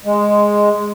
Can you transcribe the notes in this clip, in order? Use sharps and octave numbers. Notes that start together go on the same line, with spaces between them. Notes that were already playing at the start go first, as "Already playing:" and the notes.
G#3